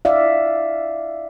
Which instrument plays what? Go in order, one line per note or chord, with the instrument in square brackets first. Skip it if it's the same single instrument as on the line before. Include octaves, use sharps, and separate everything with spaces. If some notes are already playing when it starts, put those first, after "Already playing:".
[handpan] D5 E5 F5